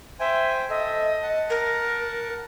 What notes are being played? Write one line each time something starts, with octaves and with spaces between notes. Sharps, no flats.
C5 E5 G5 G#5
A4 D#5 E5
F#5 A5
A#4